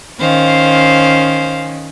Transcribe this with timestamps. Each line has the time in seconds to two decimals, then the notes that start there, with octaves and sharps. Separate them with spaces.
0.20 D#3 C#4 C5 F5